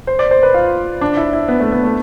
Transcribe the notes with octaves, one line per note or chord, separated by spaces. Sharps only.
C5
D5
C5
B4
F4
D4
E4
E4
B3
A3
B3
A3